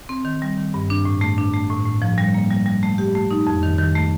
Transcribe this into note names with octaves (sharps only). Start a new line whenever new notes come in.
C4
D#3
G3
D#3
G2
D4
A2
A3
D4
A3
A2
A2
F3
G3
A#3
G3
G3
A3
G4
A3
D#4
F2
D#3
D#3
A3